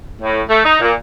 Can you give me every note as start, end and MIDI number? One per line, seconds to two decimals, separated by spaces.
0.22 0.41 45
0.50 0.61 57
0.65 0.79 63
0.81 0.94 46